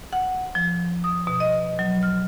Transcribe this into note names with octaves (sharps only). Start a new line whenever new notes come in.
F#5
F3
D#6
B2
D#5
F#3
F6